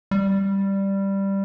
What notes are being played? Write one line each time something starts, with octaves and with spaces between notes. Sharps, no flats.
G3